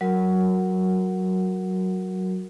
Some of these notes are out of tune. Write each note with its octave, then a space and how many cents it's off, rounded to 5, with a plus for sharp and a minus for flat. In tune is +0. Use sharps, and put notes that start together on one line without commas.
F#3 +10 F#4 -10 A#4 +0